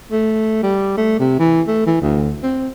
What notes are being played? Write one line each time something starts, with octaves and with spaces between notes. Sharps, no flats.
A3
G3
A3
C3
E3
A3
E3
D2
C4